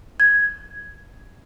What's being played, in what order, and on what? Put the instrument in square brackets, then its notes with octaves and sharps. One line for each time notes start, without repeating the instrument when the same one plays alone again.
[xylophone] G#6